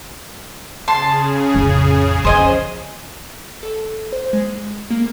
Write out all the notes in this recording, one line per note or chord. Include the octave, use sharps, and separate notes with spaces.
C#3 G#4 A5 C6
A1 F2
F2 C5 D#5 G#5
A4
C5
G#3
A#3